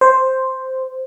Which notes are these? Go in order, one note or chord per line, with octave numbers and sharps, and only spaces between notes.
C5